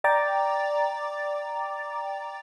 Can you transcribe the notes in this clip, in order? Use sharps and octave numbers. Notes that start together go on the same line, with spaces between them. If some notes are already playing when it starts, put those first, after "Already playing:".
D5 G5 A#5 D6 A6